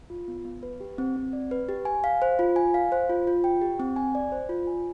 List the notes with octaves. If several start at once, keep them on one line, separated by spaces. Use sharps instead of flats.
F4
B3
B3
B4
G4
C4
C4
D5
B4
G4
G#5
F5
C5
F4
G#5
F5
C5
F4
F4
G5
G4
C4
G#5
D5
C5
F4
G#5